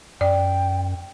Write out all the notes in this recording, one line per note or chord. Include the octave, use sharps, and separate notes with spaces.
F#2 D5 G5